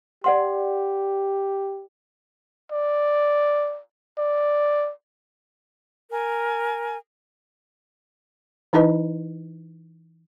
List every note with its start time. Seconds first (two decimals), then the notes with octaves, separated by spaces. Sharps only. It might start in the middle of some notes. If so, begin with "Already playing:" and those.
0.24 G4 D5 F#5 C6
2.71 D5
4.18 D5
6.11 A#4 G#5
8.73 E3 D#4 E4 B4 D#5